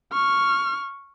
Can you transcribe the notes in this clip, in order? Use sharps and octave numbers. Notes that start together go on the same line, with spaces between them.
C#6 F6